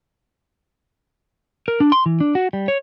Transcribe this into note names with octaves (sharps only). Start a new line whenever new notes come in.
A#4
D4
C6
E3
D4
F#4
G3
C#5